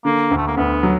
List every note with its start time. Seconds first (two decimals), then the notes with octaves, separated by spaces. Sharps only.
0.05 D3 A#3
0.31 D2
0.37 A3
0.48 A#3
0.57 D2 B3
0.83 F#3